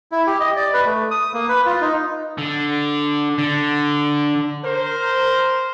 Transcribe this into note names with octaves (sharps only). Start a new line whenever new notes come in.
E4
G4
D#5
D5
B4
A3
D#6
A#3
B4
F4
D#4
D3
D3
A#4 C5